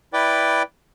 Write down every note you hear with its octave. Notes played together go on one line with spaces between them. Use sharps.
E4 B4 D5 G5 D6